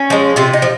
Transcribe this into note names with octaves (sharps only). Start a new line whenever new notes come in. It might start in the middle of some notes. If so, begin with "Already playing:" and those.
Already playing: C#4
F3 G#3
C3 F4
D#4
F3